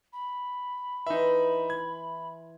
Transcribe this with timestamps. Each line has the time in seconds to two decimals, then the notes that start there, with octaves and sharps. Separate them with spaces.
0.13 B5
1.07 E3 D#4 E5 C6 C#6
1.70 G#6